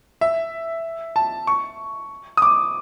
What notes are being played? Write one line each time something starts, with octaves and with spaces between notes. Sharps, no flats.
E5
A5
C#6
D#6
D6